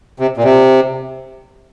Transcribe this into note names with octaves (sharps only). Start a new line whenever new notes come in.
C3
A#2
C3